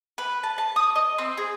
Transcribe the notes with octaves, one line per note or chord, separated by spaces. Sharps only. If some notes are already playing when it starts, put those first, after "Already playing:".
B4
A5
A5
D#6
D#5
C4
G#4